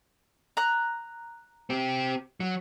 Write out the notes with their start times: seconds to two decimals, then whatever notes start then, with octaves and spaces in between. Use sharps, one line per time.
0.57 A#5 F#6
1.70 C4 G4
2.40 F#3